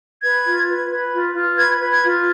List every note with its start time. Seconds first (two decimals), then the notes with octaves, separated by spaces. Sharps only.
0.22 B4 G#6
0.45 F4
0.68 B4
0.90 B4
1.13 F4
1.35 F4
1.57 B4 G#6
1.80 B4
1.91 G#6
2.04 F4